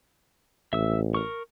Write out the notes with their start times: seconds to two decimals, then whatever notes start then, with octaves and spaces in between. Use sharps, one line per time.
0.73 A1 E5 E6
1.14 A#4 C#6